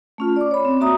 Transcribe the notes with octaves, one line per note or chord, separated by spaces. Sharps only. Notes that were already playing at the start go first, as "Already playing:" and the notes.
A3 C#4 F4
D5 D6
C#5 B5
C4
A#3 F#4 E5 A#5 D#6